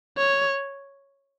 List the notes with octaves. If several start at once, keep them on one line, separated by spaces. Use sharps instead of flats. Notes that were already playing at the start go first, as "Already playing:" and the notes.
C#5